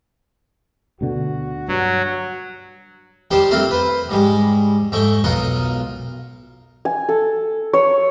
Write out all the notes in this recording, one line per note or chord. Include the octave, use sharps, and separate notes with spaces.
D2 B2 D3 F#4
G2 F#3
D#3 G3 D4 G4 C5 C6
A3 C4 F4 A#4 F5
B4 C5
G#2 G3 G#3
G#2 A3 G5 C#6
B1 D#4 F4 A#4 F#5
G#5
A4
C#5